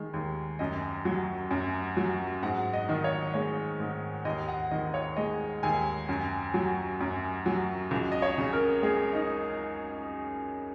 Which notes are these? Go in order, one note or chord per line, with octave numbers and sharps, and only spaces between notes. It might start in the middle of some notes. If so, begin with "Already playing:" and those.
Already playing: D#3 G#3
D#2
F#2 D#5
F#3
F#2
F#3
G#2 F#5
D#5
D#3
C#5
G#3 C#5
G#2
D#2 D#5
F#5
D#3 D#5
C#5
G#3 D#5
D#2 G#5
F#2
F#3
F#2
F#3
C#2
D#5
C#5
C#3
A#4
G#3 G#4
D#4